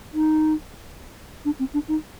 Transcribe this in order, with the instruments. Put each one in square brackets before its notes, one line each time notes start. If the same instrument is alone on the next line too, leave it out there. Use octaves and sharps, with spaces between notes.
[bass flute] D#4
D4
C4
D4
D#4